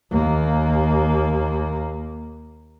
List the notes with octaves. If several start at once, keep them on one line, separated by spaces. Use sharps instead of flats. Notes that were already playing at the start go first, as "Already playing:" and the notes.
D#2 A#3